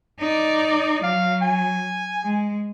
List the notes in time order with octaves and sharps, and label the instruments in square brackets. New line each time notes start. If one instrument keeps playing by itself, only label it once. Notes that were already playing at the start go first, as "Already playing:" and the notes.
[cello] D#4 D5
[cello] F#3 [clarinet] F5
[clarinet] G#5
[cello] G#3